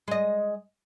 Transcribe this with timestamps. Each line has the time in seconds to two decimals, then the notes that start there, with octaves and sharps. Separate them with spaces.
0.08 G#3 D#5